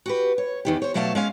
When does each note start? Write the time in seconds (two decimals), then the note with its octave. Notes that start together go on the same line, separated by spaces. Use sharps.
0.06 F#4 G4 B4
0.38 C#5
0.65 E2 D#3 G4
0.82 C5 C#5
0.94 B2 F#3 A3 D5 F5 A5
1.15 G#3 C#4 F5